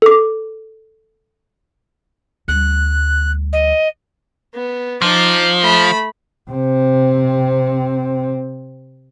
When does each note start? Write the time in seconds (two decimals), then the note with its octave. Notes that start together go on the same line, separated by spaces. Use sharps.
0.02 A4 D6
2.48 D2 G3 F#6
3.52 D#5
4.55 B3
5.02 F3 D#4 D6
5.61 A3 B5
6.51 C3 C4